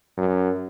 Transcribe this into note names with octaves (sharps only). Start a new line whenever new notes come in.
F#2